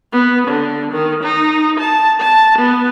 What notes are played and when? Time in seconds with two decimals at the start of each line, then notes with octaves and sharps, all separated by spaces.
0.12 B3
0.48 D3
0.92 D#3
1.24 D#4
1.80 A5
2.20 A5
2.58 B3